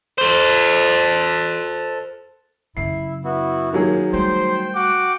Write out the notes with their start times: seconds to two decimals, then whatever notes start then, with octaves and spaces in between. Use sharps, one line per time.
0.18 A4 C5
2.77 F#2 C#3 E4 C7
3.24 B3 E4 F#4
3.73 D#3 F#3 A#3 G#4
4.13 G3 A3 C5 G5
4.74 F#4 F#5 D6